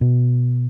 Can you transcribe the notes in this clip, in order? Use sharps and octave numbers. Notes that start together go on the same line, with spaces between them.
B2